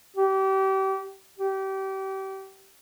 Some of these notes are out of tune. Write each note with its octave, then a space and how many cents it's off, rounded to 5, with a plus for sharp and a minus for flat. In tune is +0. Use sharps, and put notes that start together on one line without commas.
G4 -30
G4 -30